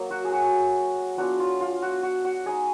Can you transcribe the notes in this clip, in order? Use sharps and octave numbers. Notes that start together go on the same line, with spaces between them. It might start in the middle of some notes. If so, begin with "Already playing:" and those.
Already playing: F#3 A#3
F#4
G#4
F#4
F#3 B3 D4 F4 F#4
F4
F4
F#4
F#4
F#4
G#3 D#4 G#4